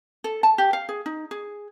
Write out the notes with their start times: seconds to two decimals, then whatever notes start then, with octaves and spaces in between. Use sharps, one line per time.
0.24 A4
0.43 A5
0.58 G4
0.73 F5
0.89 G#4
1.06 D#4
1.31 G#4